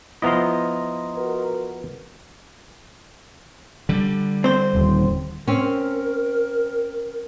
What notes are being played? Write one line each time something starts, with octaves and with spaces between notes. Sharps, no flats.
F3 B3 E4 D#5 A#5 C6
F#4 A#4 B4
D3 G3
C4 C5
D#1
C4 C#4 A#4